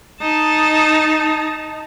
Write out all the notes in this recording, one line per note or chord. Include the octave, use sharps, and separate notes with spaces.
D#4 A5